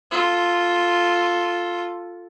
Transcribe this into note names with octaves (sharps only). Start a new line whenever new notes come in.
F4 A4